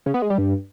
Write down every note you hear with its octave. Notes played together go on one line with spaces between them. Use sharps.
C#3
B3
G#3
G3
G2